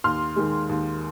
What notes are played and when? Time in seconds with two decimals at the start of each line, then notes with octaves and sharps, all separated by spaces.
0.04 D#2 C6 F6
0.36 D#3 G#3
0.69 D#2